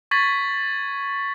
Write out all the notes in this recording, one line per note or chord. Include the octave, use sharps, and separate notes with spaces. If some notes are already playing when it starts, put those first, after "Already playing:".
C#6 G#6 A6 B6 F#7